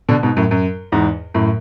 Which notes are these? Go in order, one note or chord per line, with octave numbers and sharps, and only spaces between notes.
B2 D3
G#2 B2
F#2 A2
F#2
E2 G#2
F#2 A2